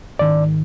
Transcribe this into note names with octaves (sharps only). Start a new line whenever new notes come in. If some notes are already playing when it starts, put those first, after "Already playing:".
G#2 D#3 D5